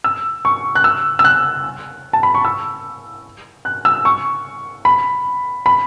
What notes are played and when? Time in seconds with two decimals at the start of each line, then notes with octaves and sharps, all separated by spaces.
0.04 E6
0.45 C#6
0.75 F#6
0.84 E6
1.19 E6
1.24 F#6
2.13 A5
2.23 B5
2.35 C#6
2.45 E6
3.65 F#6
3.85 E6
4.05 C#6
4.85 B5
5.66 B5